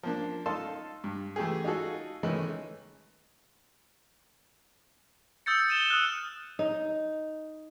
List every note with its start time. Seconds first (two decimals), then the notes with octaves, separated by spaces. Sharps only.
0.03 F3 A#3 D4
0.46 D#4 A4 F5 A5 C6
1.04 G2
1.36 E3 A3 G4 G#4
1.64 D#4 F4 F#4 G#4 A4
2.23 D#3 E3 G#3 A3 C#4
5.46 D#6 E6 G6 A6 C#7
5.69 A6 D#7 E7 G7
5.90 D#6 F6 F#6
6.59 D#4